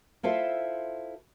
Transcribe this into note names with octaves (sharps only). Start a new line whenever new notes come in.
E4 F4 A4 C5 E5